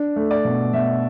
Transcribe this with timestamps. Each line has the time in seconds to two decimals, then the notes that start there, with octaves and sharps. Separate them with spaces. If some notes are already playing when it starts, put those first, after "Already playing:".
Already playing: D4
0.16 A3
0.31 D5
0.45 B2
0.73 B2 E5